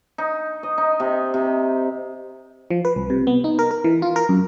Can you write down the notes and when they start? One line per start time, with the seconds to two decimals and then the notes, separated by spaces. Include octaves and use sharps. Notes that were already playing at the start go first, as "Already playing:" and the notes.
0.18 D#4
0.63 D#5
0.78 D#4
1.00 C3
1.34 C3
2.71 F3
2.85 B4
2.96 C2
3.10 C3
3.27 B3
3.44 D#4
3.59 A#4
3.71 A#4
3.84 E3
4.02 F4
4.16 A#4
4.29 F#2